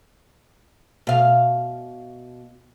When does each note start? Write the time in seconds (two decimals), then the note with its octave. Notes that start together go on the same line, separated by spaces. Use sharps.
1.07 B2 F5